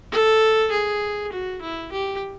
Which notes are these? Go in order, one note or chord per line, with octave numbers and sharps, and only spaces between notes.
A4
G#4
F#4
E4
G4